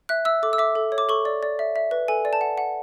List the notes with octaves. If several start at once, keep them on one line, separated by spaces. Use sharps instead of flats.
E5 F#6
E5 E6
A4 D6
E6
E5 D6
A4
C#5
D6
A4 C#6
D5
D5
E5
E5
B4
A4 G#5
D5
A5
F#5
F#5